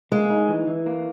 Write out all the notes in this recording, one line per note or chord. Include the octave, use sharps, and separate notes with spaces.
G#3 A#3
D#4
E3
E3
A#3